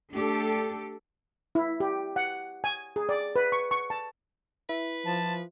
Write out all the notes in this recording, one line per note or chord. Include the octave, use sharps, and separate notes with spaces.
A3 D4 G4 A4
E4
G4
F#5
G#5
G#4
D5
B4
C#6
C#6
A5
E4 B4
F3 A5